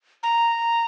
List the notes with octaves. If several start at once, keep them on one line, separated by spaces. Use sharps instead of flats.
A#5